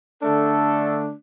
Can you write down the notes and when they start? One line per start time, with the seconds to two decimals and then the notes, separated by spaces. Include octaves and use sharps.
0.22 D3 A3 D4 A4